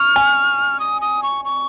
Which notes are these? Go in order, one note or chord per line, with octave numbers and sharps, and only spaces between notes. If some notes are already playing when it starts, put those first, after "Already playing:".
Already playing: C#6 F6
G#5
D#6
D#6
C#6
C#6